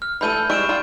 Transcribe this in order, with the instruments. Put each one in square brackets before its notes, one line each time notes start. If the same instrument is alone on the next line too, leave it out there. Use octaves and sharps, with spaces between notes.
[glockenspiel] F6
[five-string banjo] E3 A3 A4 [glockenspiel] B5 G6 D#7
[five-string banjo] G3 G#3 E4 [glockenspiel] C#6 D7 E7
[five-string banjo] G3 F4